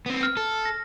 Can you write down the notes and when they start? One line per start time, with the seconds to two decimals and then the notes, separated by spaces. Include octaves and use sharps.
0.06 B3 C4
0.23 F6
0.37 A4
0.65 A#6